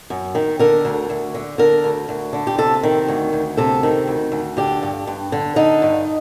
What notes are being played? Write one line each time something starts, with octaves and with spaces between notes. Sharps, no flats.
F#2
D#3
D3 A#4
D2
D2
D3
D3 A#4
D2
D2
D3
G4
C3 A4
D#3
D2
D2
C3 A4
D#3
D2
D2
D3 G4
G2
G2
D3
D3 D#4
G2